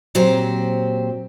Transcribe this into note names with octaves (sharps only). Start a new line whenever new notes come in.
A#2 F#3 C4 G4 C5